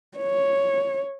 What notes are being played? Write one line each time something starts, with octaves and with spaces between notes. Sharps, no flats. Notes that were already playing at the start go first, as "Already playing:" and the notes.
C#5